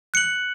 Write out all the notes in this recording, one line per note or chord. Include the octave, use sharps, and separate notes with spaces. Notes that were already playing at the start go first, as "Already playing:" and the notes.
F#6 C#7 F#7